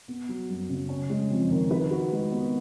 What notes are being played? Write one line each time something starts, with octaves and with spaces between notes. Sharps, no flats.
B3
F#3
F#2
C#3
C#4
G#3
F2
D#3
B4
F#4
G#3
B3